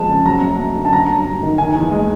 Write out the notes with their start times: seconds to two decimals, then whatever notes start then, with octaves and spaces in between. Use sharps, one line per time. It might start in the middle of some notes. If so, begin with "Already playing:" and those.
Already playing: F2 F3 G#3 A5
0.08 C#3
0.26 F#3 A#5
0.42 F#2
0.59 F#2
0.76 D3
0.85 A5
0.93 F#3 A#5
1.09 G2
1.26 G2
1.43 D#3
1.58 D#3 G#5
1.76 E2
1.91 G#3